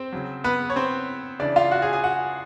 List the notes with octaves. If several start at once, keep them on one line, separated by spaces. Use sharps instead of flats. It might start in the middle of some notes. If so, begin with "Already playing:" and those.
Already playing: C4 C5
C#3 F#3
B3 B4
C#5
C4 C5
C#3 E3 D4 D5
F4 F5
F#4 F#5
G#4 G#5
G#4 G#5
F#4 F#5